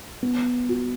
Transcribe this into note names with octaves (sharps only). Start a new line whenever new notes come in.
B3
F#4